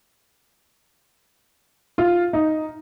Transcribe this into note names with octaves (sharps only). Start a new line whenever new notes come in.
F4
D#4